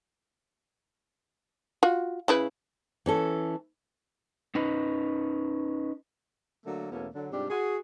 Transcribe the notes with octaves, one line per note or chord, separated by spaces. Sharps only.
F4 F#4
C#3 E4 B4
E3 C#4 A4
C#4 D#4 B4
D3 F#3 A3 A#3
E2 B2 A3 A#3 C#4
D3 F#3 D4
G#2 C3 G3 D4 F4 G4
F#4 G#4